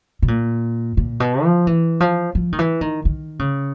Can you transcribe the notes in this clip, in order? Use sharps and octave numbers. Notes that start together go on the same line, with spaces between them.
B2
A#2
A#2
B2
F3
E3
F3
F3
D#3
E3
D#3
D#3
C#3